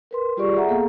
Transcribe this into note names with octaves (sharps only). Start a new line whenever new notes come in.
A#4 B4 C6
G3 F4 G4 G#4 D5 C#6
G#4 A4 E5 F#5 A#5
A#3 B3 G#4 A4 F5 A#5